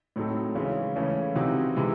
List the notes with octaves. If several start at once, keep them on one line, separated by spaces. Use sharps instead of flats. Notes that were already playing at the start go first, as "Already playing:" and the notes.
A2 F#3 C4 D#4 A4
C#3 E3 G#3 C#4
C#3 E3 A3 C#4 E4
C3 E3 C4 D#4 F#4
C3 E3 G#3